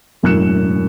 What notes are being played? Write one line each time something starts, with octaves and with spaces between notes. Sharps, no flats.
E1 F#2 A2 F#6 C#7 E7